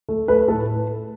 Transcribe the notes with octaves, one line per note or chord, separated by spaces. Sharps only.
A3
A3 B4
A2 A4